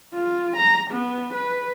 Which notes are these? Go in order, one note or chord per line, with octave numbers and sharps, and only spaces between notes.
F4
A#5
B3
B4